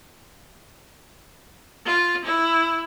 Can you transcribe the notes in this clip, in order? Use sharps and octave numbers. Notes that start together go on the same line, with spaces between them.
F4
E4